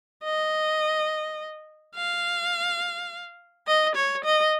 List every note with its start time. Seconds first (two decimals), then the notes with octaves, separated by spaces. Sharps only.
0.24 D#5
1.96 F5
3.67 D#5
3.96 C#5
4.25 D#5